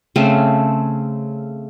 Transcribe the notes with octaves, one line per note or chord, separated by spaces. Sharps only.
C#3 A3 C4